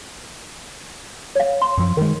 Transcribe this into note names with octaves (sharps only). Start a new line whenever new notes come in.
C#5 F5
C6
F#2 F3
D#3 G#3 A#4